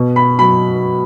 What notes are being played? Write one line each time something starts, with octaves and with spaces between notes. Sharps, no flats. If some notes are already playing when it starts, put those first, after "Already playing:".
Already playing: B2
B5
F#3 B5